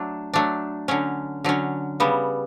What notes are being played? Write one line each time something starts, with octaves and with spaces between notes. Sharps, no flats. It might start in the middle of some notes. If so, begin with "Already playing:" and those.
Already playing: F#3 A3 D4
F#3 A3 D4
D3 F#3 C#4
D3 F#3 C#4
C#3 G3 B3